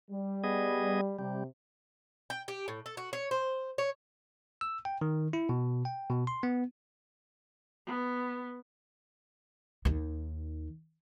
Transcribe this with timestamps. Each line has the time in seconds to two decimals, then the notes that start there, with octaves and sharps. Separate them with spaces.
0.10 G3
0.44 B3 G#4 D#5
1.19 C3 G3
2.30 G5
2.48 G4
2.68 A2
2.86 A4
2.97 F#4
3.13 C#5
3.31 C5
3.78 C#5
4.61 E6
4.85 G5
5.01 D#3
5.33 E4
5.49 B2
5.85 G5
6.10 B2
6.27 C6
6.43 B3
7.87 B3
9.85 D#2 D#3